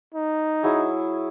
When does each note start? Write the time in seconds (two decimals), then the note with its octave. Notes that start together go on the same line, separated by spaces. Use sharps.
0.14 D#4
0.63 F#3 E4 G#4